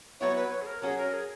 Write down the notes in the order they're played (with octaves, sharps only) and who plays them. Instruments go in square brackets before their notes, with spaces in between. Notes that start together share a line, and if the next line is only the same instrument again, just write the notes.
[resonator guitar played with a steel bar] F#3 B3 E4 [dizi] C#5
[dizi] B4
C#5
G#4
A#4
[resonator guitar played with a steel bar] F#3 C#4 F#4 [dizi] G#4
[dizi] A#4
G#4